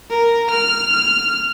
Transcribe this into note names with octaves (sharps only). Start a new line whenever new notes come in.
A#4
F6
F6